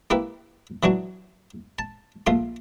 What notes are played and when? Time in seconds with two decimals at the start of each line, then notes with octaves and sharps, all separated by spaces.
0.10 A#3 E4 G4 B4
0.83 E3 F#3 D4 F#4
1.79 A5
2.27 A#1 A3 F4 C6